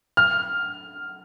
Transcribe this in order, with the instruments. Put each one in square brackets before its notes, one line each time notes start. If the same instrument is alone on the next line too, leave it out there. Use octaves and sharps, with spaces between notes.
[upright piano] F6